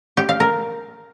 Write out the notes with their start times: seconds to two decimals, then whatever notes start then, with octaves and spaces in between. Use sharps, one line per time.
0.17 G4
0.29 F5
0.40 A#4